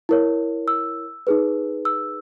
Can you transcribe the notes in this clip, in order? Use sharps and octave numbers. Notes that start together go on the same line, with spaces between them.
E4 A#4 C#5
E6
D#4 G#4 B4
E6